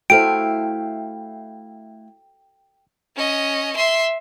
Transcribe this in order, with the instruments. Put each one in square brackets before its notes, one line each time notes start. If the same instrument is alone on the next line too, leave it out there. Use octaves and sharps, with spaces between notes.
[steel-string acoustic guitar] A3 E4 F5 [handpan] F#4 A4 C5 [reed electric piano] G5 [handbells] D7
[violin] C#4 D#5
E5 C6